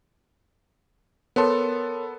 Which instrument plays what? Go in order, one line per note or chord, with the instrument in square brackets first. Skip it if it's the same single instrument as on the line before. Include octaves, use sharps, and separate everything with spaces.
[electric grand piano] B3 A4 [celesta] A#4 C#5 C6